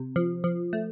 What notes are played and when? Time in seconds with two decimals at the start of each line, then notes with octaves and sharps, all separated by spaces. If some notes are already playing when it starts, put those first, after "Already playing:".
Already playing: C3
0.16 F3
0.44 F3
0.73 A3